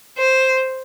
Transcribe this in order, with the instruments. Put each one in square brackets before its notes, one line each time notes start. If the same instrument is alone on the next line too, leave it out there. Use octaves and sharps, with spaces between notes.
[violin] C5